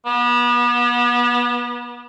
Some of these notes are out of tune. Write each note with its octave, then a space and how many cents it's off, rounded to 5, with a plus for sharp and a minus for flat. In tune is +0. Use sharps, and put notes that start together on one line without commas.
B3 -35